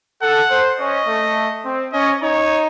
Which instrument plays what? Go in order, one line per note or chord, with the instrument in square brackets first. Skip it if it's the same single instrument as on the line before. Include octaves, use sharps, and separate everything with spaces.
[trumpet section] A4 [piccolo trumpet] F#5
[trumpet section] C5
[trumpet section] C#4 [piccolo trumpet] D#5
[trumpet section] A3
C4
[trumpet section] C#4 [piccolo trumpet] D#5
[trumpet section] D#4 [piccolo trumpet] C#5